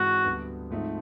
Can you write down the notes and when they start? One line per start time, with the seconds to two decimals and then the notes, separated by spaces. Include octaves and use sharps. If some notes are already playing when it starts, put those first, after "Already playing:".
Already playing: G#2 E3 G#3 C4 F#4
0.24 D2 D3 G3 B3
0.70 G#2 F3 A3 C4 D#4